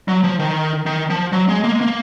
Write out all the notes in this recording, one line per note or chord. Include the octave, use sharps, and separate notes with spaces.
F#3
F3
D#3
D#3
F3
F#3
G#3
A#3
G#3
A#3